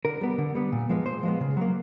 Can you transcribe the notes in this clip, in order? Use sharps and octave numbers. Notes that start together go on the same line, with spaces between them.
D3 A#4
G3 B3
D3
G3 B3
A#2
F3 G#3 B3
A#2 C5
F3 G#3 B3
C#3
F#3 A#3